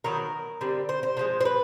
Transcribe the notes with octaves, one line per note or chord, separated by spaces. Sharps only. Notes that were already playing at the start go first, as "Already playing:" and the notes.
D#3 F#3 B3 A#4
D3 G3 C4
C5
C5
D3 F3 G#3
C5
B4